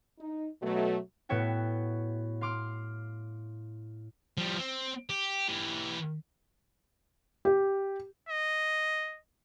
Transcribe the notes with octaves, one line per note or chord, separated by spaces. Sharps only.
D#4
B2 F#3 A3
A2 B3 F#4 C#5 E5 G5
F5 C6 D6 F6
F3 G3
C4
G4
E3 G4
G4
D#5